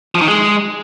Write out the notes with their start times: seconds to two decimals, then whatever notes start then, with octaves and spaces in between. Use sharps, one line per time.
0.15 F3
0.21 D#3
0.28 G#3